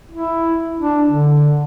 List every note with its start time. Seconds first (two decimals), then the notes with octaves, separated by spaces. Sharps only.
0.12 E4
0.80 D4
1.09 D3